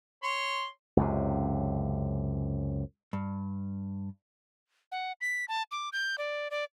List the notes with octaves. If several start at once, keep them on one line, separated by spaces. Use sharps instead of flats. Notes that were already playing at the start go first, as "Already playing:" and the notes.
C#5 C6
C#2 F#2 C3
G2
F#5
B6
A5
D6
G6
D5
D5